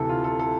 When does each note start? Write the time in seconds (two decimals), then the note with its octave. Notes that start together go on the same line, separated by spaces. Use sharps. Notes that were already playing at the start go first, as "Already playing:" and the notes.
Already playing: D2 C3 E3 A4
0.09 F4
0.24 A4
0.40 A4